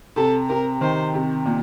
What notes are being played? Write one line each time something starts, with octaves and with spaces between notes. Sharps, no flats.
C3 A4
C3 A#4
D#3 C5
C3
A#2